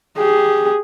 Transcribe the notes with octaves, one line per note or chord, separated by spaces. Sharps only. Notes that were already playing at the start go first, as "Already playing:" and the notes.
G4 G#4